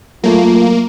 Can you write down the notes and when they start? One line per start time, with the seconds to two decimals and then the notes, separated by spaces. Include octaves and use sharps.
0.24 F#3 A3 A#3 F4